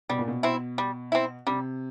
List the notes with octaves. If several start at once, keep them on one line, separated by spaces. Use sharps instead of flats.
B2 G3
A#2
B2
C4 E4
G3
C4 E4
C3 G3